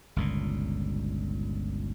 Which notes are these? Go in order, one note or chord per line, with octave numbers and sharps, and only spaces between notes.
G1 C#2 A#2